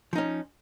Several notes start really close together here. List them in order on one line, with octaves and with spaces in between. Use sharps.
F3 D#4 C#4